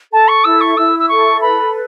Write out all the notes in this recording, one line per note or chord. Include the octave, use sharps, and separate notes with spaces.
A4 A5
C#6
E4 E6
C#6
E4 E6
E6
A4 C#6
B4 B5